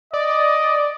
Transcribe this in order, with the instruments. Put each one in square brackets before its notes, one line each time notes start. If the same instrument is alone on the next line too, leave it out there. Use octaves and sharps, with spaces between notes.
[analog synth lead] D5 [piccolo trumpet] D#5